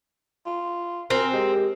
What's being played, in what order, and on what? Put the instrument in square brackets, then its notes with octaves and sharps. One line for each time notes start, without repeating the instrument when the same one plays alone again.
[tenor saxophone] F4
[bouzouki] C4 [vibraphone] F#4 C5 G#5 [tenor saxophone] A#4
[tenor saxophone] G#3 [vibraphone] G4 A#4